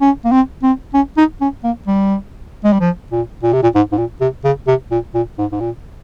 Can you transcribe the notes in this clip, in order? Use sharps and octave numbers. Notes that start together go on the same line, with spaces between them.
C#4
A#3
C4
C4
C#4
D#4
C#4
A#3
G3
G#3
G3
F3
A#2
A#2
C3
A#2
G#2
G#2
A#2
C3
C#3
C3
A#2
A#2
G#2
G#2
A#2